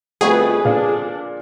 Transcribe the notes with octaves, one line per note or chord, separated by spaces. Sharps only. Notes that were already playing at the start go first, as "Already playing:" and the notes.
G1 F2 A3 F#4 G#4 B4
A#2 D4 F5